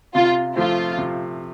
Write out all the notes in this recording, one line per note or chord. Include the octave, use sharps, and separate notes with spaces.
C3 F4
F3 A3 C4 F4
C3